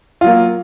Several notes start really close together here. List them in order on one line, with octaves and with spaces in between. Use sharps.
F4 F#3 A#3